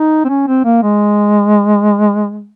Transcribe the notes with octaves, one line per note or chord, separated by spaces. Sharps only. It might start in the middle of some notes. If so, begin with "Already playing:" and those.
Already playing: D#4
C4
C#4
C4
A#3
G#3